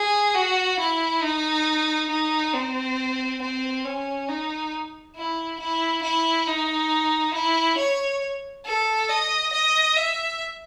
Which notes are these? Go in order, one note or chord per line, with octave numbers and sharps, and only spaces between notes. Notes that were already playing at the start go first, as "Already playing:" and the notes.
Already playing: G#4
F#4
E4
D#4
D#4
C4
C4
C#4
D#4
E4
E4
E4
D#4
E4
C#5
A4
D#5
D#5
E5